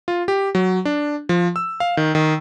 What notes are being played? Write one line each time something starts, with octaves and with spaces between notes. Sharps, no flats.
F4
G4
F#3
D4
F3
E6
F5
D#3
D#3